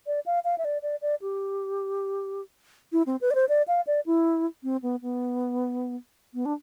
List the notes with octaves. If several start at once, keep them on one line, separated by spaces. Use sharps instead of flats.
D5
F5
F5
E5
D5
D5
D5
G4
E4
C4
B4
D5
C5
D5
F5
D5
E4
C4
B3
B3
B3
D4